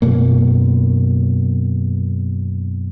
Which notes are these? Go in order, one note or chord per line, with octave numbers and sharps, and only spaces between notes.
F#2 B2 A#3